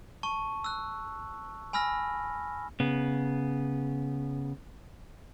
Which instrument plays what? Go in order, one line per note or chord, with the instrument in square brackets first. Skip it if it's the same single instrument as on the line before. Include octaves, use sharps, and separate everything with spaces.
[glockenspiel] A5 C#6
E6 F#6
G#5 B5 E6 F6 A#6
[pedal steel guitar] C#3 B3